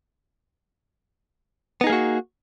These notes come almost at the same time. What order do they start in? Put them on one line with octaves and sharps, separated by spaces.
B3 D#4 G#4 A#3 F#4